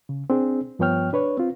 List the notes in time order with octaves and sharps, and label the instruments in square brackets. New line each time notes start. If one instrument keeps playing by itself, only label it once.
[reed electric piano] C#3
C4 D4 G#4
G2 F3 B3 C#5 G5 F6
D4 B4 C#5
C4 F4